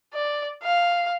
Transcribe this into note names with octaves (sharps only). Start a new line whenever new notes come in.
D5
F5